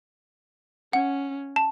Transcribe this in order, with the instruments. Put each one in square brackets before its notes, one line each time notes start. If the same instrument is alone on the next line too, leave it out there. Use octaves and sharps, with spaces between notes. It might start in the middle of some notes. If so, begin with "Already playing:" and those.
[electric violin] C#4 [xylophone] F#5
[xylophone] A5